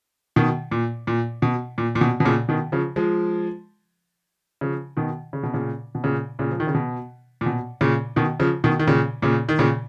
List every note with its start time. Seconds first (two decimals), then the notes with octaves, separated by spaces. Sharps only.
0.36 B2 D#3
0.71 A#2
1.07 A#2
1.42 B2
1.78 A#2
1.95 A#2
2.01 B2
2.20 B2
2.25 A#2 C#3
2.49 B2 D#3
2.72 C#3 F3
2.96 F3 G#3
4.61 C#3 F3
4.97 B2 D#3
5.33 C#3
5.43 B2
5.54 A#2 C#3
5.95 B2
6.04 A#2 C#3
6.39 A#2 C#3
6.52 F3
6.60 D#3
6.67 C#3
6.74 B2
7.41 A#2
7.46 B2
7.81 A#2 C#3
8.16 B2 D#3
8.40 C#3 F3
8.64 B2 D#3
8.79 D#3
8.87 A#2 C#3
9.22 A#2 C#3
9.49 D#3
9.59 A#2 C#3